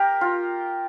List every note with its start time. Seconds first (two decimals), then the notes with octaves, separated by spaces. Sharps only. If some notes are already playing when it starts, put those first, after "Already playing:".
Already playing: G4 A#4
0.21 F4